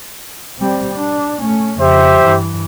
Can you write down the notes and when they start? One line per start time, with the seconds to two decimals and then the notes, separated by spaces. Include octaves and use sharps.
0.58 G3 C4
0.94 D4
1.41 A3 C#4
1.80 F2 C#3 G4 C5 E5
2.21 G2 E3